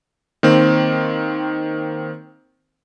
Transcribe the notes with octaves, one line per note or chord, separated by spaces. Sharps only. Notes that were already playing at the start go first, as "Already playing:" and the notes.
D#3 A#3 C4